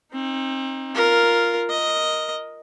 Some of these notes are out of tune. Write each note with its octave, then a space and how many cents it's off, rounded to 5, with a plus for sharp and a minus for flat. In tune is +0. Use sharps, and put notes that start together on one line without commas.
C4 +30 D#4 +0
F4 +0 A#4 +0
A#4 +0 D#5 +0